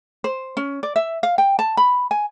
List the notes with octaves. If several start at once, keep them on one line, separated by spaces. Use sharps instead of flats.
C5
C#4
D5
E5
F5
G5
A5
B5
G#5